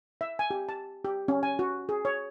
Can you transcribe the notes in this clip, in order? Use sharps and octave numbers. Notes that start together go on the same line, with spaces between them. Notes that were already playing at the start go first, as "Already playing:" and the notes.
E5
G#5
G4
A5
G4
C#4
G#5
F#4
G#4
C#5